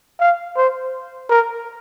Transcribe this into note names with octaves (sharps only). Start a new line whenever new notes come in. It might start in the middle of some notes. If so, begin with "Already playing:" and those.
F5
C5
A#4